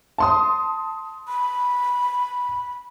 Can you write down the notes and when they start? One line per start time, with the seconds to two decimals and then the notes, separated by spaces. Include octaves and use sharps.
0.18 A5 C6 D#6
1.28 B5